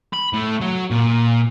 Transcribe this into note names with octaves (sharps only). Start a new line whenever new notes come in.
B5
A2
F#3
A#2